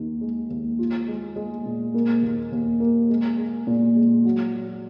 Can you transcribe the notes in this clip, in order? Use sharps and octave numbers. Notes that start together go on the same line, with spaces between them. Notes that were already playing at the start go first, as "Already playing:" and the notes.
Already playing: D#2 D#3
G#3
D#2
F4
G#3
G#3
A#2
A#3
D#2
D#2
A#3
G#3
G#4
A#2
G#3
F#3
F#3